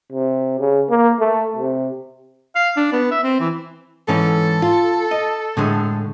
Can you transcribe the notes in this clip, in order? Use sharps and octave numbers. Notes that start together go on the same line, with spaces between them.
C3
C#3
A#3
A3
C3
F5
D4
B3
E5
C4
E3
G#2 E3 C#4 A4
F4
D#5
A2 D3 G#3